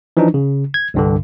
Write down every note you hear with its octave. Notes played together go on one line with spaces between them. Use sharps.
E3 F3 D4 D#4
C#3
G#6
C2 G2 D3